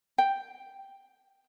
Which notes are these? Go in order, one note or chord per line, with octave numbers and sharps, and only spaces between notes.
G5